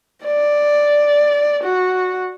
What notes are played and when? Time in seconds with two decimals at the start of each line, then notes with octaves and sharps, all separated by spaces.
0.25 D5
1.64 F#4